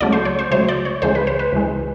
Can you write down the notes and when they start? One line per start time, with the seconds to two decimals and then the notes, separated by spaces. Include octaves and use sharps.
0.01 C#2 C#3 F#3 A3 D5
0.12 C5
0.25 C#5
0.39 C5
0.51 C#2 C#3 F#3 A3 C5
0.68 D5
0.85 C#5
1.02 C#2 C#3 E3 G#3 C5
1.15 B4
1.27 C5
1.39 B4
1.52 C#2 C#3 E3 G#3